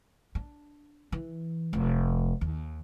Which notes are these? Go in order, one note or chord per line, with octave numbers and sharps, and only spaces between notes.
D4
E3
F1
D#2